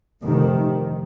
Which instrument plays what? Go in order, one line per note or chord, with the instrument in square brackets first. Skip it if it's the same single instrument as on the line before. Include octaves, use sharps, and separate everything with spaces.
[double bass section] F1 F2 C3 D#3